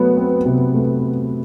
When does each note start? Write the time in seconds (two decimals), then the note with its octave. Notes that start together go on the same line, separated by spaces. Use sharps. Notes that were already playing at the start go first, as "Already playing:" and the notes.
Already playing: F#3 A3 B3
0.17 C4
0.46 C3
0.74 A3